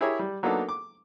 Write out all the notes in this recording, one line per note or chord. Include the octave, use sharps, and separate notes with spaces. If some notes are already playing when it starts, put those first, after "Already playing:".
E4 G4 G#4 A#4 C#5 E5
G3
F#3 A#3 B3 D4 D#4 A4
D6